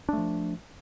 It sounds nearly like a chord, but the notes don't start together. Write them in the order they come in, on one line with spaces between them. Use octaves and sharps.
D4 A3 F3